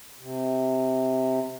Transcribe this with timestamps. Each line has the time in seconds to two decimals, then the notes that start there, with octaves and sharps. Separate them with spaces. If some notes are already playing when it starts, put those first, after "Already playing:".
0.18 C3